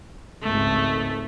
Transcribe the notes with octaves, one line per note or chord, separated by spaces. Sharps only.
G#1 C#2 A3